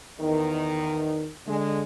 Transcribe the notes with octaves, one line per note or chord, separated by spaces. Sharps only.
E2 D#3
D3 G#3